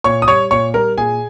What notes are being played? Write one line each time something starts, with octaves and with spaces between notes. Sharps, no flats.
A#2 C#5 C#6
D#6
G3 C#5 C#6
A#2 C#5 C#6
G3 A#4 A#5
A#2 G#4 G#5